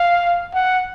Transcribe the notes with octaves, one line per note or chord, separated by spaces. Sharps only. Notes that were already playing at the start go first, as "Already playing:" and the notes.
Already playing: F5
F#5